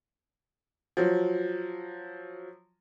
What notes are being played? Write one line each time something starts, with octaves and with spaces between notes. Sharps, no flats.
F3 F#3